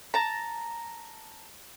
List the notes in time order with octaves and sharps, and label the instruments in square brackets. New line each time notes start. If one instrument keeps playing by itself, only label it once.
[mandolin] A5 A#5